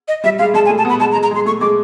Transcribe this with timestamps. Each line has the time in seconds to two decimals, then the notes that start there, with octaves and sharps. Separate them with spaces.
0.08 D#5
0.24 G3 E5
0.39 G#3 F5
0.54 G#3 A5
0.66 G#5
0.69 A3
0.78 A5
0.85 B3 B5
1.00 G#3 A5
1.12 A#5
1.16 G#3
1.23 A#5
1.31 G#3 C6
1.46 A3 C#6
1.61 G#3 D6